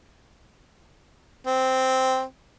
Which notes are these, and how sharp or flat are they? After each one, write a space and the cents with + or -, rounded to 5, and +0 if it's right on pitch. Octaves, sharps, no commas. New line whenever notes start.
C4 -5